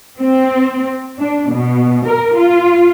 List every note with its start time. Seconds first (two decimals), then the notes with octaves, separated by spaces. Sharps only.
0.19 C4
1.19 D4
1.50 B2
2.07 A#4
2.37 F4